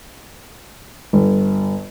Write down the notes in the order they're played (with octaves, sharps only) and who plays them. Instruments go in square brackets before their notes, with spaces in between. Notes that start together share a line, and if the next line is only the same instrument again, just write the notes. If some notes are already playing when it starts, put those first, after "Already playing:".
[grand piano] G1